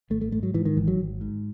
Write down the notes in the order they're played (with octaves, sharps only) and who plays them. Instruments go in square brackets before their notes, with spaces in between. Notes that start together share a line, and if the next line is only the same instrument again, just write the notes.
[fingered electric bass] G#1 A3
A3
G#2 A3
F#3
G#2 E3
D#3
G#1 E3
F#3
G#1
G#2